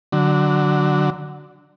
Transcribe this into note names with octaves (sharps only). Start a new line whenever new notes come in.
D3 F#3